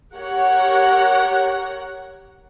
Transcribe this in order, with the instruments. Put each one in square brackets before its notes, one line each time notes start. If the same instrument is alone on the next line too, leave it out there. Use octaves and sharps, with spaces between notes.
[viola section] G4 A#4 C#5 F#5